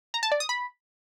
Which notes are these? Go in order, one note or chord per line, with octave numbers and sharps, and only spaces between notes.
A#5
A5
D5
D#6
B5